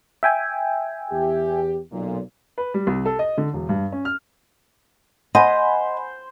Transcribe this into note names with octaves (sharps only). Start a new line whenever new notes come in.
E5 G5 G#5
E2 G4
B1 A#2
B4
G3
C2
A4
D#5
D3
E1
G2
C#4
F6
C5 D#5 F#5 G#5 B5